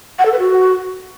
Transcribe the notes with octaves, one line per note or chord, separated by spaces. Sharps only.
F#5
A4
B4
F#4